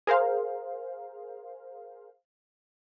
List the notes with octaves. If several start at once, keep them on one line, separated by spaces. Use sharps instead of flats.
G#4 A#4 C5 F5